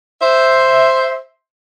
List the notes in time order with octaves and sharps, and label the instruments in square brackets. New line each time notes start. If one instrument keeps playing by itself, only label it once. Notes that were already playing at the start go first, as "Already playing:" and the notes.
[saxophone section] C5 E5